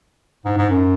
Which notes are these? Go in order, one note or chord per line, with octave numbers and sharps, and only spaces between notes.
G#2
G#2
F#2